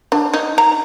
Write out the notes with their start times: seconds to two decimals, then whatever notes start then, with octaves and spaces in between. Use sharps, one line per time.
0.12 D4
0.34 D#4
0.58 A#5